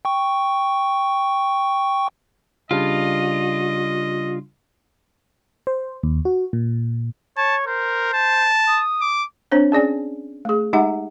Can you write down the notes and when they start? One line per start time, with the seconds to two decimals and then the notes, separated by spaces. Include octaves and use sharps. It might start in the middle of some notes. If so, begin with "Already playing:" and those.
0.05 G5 C#6
2.71 C#3 G3 D4 F4 D#5
5.67 C5
6.03 D#2
6.25 F#4
6.53 A#2
7.37 C#5 A5
7.67 A#4 C5
8.14 A5
8.67 D#6
9.01 D6
9.51 C4 D4 C5 C#5
9.72 C#4 G#4 D5 G#5
10.45 A3 G#4
10.73 G#3 D#4 G4 E5 F#5 A#5